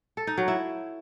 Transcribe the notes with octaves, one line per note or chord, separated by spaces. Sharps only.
A4
D#4
F#3
E4